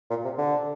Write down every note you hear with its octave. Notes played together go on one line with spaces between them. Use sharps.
A#2
C3
D3